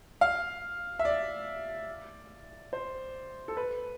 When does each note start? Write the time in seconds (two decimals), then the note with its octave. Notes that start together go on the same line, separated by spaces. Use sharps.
0.21 F5
0.99 E5
1.05 D5
2.73 C5
3.48 A4
3.57 B4